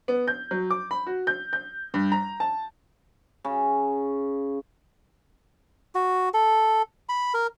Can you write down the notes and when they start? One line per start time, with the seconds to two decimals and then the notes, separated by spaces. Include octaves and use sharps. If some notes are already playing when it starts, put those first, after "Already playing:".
0.08 B3
0.27 G6
0.51 F#3
0.71 D6
0.91 B5
1.07 F#4
1.27 G6
1.53 G6
1.94 G2
2.12 A#5
2.40 A5
3.44 C#3
5.95 F#4
6.34 A4
7.09 B5
7.34 A#4